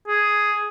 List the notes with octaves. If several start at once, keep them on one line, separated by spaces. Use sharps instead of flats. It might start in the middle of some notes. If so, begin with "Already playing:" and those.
G#4